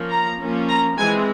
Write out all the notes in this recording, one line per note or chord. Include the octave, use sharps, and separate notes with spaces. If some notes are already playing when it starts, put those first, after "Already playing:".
Already playing: F3 A#3 C#4
A#5
F3 A#3 C#4
A#5
E3 G#3 C4 G#5